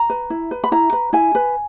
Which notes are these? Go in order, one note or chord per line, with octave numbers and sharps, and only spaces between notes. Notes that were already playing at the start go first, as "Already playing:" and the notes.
Already playing: A#5
B4
E4
B4
B5
E4 A#5
B4
E4 G#5
B4